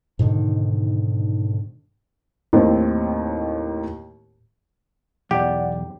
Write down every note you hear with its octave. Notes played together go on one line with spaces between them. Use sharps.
G#2 B2 D3 D#3
D#2 A2 D#3 C4
B1 E2 G4 D5 F#5